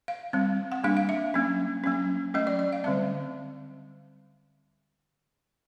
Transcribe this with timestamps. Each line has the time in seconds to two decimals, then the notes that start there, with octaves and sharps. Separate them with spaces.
0.08 F5
0.33 G3 C4
0.72 F#5
0.84 G3 A#3 D4 F5
0.97 F5
1.09 E5
1.34 F#3 A#3 C#4
1.84 F#3 A#3 C#4
2.34 F#3 A3 C#4 D#5
2.47 D5
2.59 D5
2.73 F5
2.84 D3 G3 C4 E5